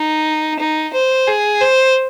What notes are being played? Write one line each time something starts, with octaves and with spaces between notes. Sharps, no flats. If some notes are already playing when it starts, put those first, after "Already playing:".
Already playing: D#4
D#4
C5
G#4
C5